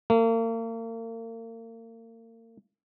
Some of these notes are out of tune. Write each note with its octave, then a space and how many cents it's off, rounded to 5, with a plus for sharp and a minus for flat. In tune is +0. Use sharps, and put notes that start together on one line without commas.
A#3 -40